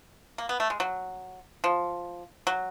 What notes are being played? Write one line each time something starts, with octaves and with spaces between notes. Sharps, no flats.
A#3
B3
A3
G#3
F#3
F3
F#3